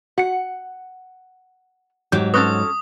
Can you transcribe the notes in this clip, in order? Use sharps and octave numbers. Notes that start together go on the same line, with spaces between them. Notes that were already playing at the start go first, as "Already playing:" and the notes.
F#4 F#5 C#7
G#2 F#3 G4 D6 G6
C4 C#4 A4 B4 C#6 D#6 F#6